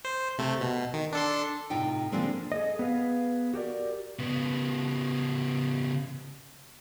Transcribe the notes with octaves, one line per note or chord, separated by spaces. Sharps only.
C5
C3 A3
B2
D#3
D4 A4 C6
A2 C3 D#4 F4 G5
D3 F3 G#3 A#3 C4 D4
G#4 A4 D#5
B3 G#4 B4 F5
F#4 G4 A#4 D5
C#3 B3